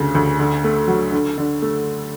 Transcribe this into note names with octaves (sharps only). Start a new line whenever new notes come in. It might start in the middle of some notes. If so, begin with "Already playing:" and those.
Already playing: D2 C#3
D2
D3
A3
F#3
D3
D3
A3